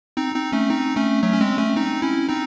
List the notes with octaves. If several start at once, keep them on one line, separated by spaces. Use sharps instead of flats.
C4 D#4
C4 D#4
A3 C#4
C4 D#4
A3 C#4
F#3 A3
C#4
G#3 C4
A3 C#4
C4 D#4
C#4 E4
C4 D#4